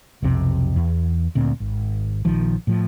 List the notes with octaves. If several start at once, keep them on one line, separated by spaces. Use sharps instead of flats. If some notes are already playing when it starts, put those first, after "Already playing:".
B1 F2 C3 C4
E2
D2 A#2 C4
G#1
A#1 D#3 F3
A2 F3